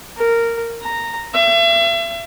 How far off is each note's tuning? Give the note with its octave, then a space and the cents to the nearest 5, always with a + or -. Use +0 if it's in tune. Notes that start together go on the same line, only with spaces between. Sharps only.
A#4 -10
A#5 -10
E5 +40